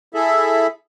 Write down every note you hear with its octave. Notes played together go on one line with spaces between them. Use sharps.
E4 G#4 A4 E5